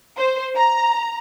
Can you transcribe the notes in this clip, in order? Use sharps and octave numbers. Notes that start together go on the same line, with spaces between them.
C5
A#5